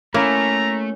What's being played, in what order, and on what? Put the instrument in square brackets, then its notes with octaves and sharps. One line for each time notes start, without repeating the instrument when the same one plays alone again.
[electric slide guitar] A3 [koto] A#3 E4 [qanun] C#4 [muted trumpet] A#5